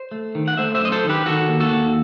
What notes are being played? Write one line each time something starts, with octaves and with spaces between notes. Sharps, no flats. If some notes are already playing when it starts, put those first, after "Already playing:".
Already playing: C5
A3
D#3
F#5
A3 C5 E5
C5 E5
F#2 D#5
A4 C5
D#3
G4 B4
D#3 F#4 A4
D#2
F#4 A4
D#2